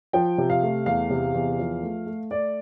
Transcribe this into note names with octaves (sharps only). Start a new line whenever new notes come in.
F3 G5
C3
F5
A3
E2 F5
C3
E2
F3
A3
A3
A3 D5